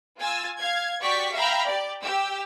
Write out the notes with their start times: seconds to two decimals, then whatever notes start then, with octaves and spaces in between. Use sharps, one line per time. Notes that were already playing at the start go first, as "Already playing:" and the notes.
0.19 F4 G#5 E6 A6
0.59 F5 G#6
1.01 F#4 G4 D5 C#6 B6
1.33 E5 F5 G5 A#5 B5
1.66 G4 D5
2.02 G4 E6